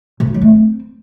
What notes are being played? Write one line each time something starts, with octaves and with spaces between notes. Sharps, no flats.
C3
D#4
F#3
A3
C4